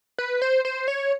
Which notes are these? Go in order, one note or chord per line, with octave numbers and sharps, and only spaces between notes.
B4
C5
C5
C#5